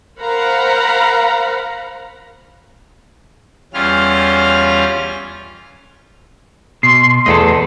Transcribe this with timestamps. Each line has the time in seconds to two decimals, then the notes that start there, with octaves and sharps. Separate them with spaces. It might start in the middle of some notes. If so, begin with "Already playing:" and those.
0.19 A#4 C5 F5 F#5 A#5 B5
3.74 E2 G3 C#4 F4 F6
6.83 B2 C6
7.26 E2 A3 A4 D#5